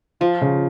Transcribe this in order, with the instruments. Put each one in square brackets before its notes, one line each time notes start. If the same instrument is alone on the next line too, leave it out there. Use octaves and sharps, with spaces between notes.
[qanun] F3 [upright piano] F4
[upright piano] C#3